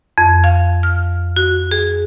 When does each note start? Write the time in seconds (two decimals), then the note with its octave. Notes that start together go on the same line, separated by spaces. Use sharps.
0.18 F2
0.44 F5
0.83 F6
1.36 F#4
1.71 G#4